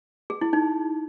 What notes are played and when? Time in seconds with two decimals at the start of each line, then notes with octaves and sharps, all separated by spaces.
0.30 G#4
0.41 E4
0.53 D#4